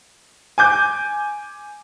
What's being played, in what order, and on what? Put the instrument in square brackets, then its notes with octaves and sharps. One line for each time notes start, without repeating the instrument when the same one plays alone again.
[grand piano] G#5 D6 G6